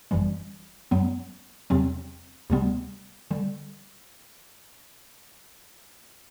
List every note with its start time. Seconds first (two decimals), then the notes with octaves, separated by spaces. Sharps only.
0.11 G1 F#2 E3 G3
0.91 F#2 F#3 B3
1.70 E2 C3 F#3 C4
2.50 D2 C3 G3 B3
3.31 D3 G3